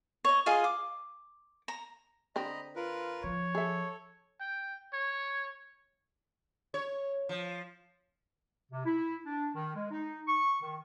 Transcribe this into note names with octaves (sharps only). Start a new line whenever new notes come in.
C#5 D#5
F4 G#4 D#5 F5
D6
A#5
D3 C4 D#5 A#5 B5
F4 A#4 B4
F3 C#5
G#4 A4 E5
G5
C#5
C#5
F3
C3
E4
D4
D#3
G#3
D#4
C#6
D#3